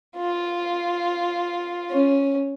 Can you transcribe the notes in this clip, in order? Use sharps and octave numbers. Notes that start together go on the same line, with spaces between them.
F4
C#4